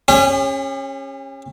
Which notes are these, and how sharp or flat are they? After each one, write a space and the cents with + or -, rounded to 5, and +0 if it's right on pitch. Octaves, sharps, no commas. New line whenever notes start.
C#4 -20 G4 +45